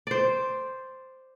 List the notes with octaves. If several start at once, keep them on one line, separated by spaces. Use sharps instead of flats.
C5 D5